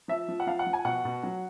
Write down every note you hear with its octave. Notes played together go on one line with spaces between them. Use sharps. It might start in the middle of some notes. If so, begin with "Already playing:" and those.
F3 E5
F3
F#5
F3 F5
F#5
F3
G#5
B2 F#5
B2
F#3